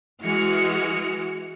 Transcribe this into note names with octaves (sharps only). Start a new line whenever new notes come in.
E3 G#3 F#4 F6 C#7